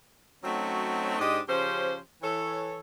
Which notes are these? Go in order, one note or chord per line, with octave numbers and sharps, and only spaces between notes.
F#3 A3 C4 C#4 D#4 F#4
G#2 D4 G4 C5 D#5
C#3 F3 C#4 G4 C5
E3 A4 C#5